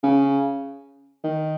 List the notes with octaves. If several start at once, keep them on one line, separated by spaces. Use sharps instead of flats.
C#3
D#3